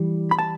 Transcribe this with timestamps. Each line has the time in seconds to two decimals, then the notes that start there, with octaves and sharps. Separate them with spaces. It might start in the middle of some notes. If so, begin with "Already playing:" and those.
Already playing: E3 G3 E4
0.31 B5
0.39 A5